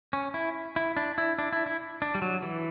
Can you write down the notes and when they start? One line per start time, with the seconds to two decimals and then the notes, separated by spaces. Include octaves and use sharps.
0.13 C#4
0.34 E4
0.76 E4
0.97 D4
1.18 E4
1.39 D4
1.53 E4
1.66 E4
2.02 D4
2.15 G3
2.22 F#3
2.42 E3